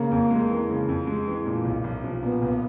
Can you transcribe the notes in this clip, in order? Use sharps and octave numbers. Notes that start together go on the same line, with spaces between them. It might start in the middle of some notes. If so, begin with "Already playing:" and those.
Already playing: C#3 A#3
F2
G#3
E3
C#3
F2
G#3
E3
A#2
B1
B1
F3
A#2 B3
B1